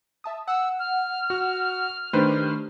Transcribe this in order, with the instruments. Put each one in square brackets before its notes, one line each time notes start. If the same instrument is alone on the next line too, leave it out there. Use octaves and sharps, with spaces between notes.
[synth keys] E5 A5 D#6
[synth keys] F#5 [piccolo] E6
[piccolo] F6
[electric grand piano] F#4
[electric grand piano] D#3 B4 C5 [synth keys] A3 D4 G4